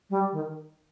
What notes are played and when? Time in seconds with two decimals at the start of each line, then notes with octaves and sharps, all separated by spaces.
0.10 G3
0.32 D#3